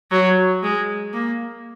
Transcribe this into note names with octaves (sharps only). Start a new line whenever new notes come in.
F#3
G#3
A#3